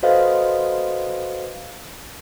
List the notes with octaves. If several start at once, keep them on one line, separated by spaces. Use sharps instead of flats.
F#4 A4 B4 C5 D#5 F5